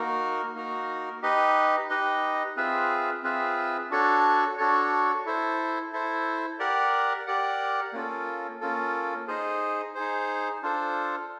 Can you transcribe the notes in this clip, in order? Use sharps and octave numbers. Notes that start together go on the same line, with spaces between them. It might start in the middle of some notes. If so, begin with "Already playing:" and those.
Already playing: A#3 D#4 F#4 A#4
A#3 D#4 F#4 A#4
D#4 G4 B4 D#5
D#4 G4 B4 D#5
C4 F4 G#4 B4 E5
C4 F4 G#4 B4 E5
D4 F#4 A4 C#5
D4 F#4 A4 C#5
E4 A4 C5
E4 A4 C5
G4 A#4 D5 F#5
G4 A#4 D5 F#5
A#3 C#4 F4 A4
A#3 C#4 F4 A4
D#4 G#4 C5
D#4 G#4 C5
D4 F4 A4 C5